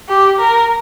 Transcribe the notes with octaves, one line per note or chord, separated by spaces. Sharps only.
G4
A#4